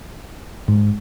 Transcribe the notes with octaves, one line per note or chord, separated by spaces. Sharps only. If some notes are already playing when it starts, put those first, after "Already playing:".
G#2